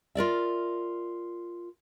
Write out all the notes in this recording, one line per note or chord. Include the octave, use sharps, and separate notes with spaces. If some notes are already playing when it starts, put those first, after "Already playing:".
F4 A#4 D5 E5